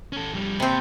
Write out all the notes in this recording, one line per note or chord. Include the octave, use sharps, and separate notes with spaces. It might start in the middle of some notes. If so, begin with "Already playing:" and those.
C#4 A4
F2 G3
C3 A#3 C4 B5